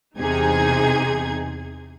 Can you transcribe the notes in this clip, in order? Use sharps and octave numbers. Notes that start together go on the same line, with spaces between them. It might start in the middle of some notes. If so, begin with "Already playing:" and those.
E2 C3 D#4 G#4 G#6